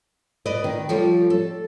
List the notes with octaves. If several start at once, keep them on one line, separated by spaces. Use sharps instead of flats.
B4 D5 D#5
D#3
F3 G3 A4 C#5
A4